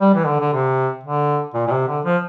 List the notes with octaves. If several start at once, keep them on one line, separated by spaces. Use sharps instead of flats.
G3
E3
D3
D3
C3
D3
A#2
A#2
C3
D3
F3